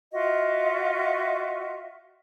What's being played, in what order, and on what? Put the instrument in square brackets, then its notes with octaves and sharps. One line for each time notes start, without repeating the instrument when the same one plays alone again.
[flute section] F4 F#4 D#5 E5